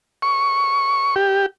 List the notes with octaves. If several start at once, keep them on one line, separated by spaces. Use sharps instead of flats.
C#6
G4